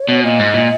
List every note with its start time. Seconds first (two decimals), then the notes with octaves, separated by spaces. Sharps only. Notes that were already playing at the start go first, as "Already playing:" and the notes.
Already playing: C#5
0.09 B2
0.24 A#2 D#5
0.39 G#2
0.54 A#2